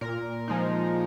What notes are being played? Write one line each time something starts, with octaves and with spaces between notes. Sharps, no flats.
A#2 A#4
F3 G#3 D#4